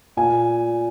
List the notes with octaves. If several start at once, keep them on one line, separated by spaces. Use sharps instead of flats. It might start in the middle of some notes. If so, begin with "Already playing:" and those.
A#2 G#5